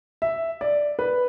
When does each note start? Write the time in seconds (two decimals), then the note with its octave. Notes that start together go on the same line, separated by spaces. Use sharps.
0.22 E5
0.61 D5
0.99 B4